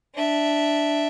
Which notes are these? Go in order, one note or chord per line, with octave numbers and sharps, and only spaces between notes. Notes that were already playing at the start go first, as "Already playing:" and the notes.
D4 E5